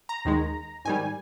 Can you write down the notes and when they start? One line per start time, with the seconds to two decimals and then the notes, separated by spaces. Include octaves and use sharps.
0.09 A#5
0.25 D#2 D#3 G#3
0.85 G#2 D#3 G3 G#5